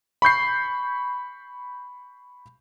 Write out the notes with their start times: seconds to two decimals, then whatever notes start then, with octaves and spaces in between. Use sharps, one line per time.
0.22 B5 C#6 G6 C7